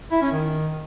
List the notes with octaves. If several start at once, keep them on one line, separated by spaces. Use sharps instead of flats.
E4
C#4
D#3